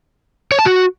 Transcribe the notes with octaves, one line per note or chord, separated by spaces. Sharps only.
C#5
A5
F#4